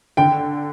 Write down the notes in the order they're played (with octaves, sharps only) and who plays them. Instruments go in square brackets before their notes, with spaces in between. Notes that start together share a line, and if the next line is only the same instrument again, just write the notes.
[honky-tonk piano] D3 [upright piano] G5